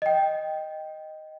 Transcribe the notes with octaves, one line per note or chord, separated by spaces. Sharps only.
D#5 G5